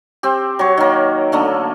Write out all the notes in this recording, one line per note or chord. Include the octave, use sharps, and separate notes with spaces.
C4 G4
F#3 C#5
D#3 A#3
D3 A3 A#3